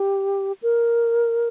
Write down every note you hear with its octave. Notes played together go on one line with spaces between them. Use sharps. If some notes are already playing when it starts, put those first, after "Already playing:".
Already playing: G4
A#4